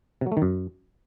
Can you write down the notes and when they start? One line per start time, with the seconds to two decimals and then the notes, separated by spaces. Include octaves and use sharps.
0.21 C3
0.27 F#3
0.32 A3
0.37 D#3
0.42 F#2